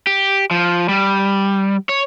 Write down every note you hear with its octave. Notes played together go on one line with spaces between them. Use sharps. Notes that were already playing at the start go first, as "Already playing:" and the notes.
G4
F3
G3
C#5